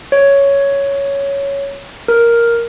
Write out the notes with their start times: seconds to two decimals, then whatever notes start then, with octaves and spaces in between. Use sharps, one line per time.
0.12 C#5
2.08 A#4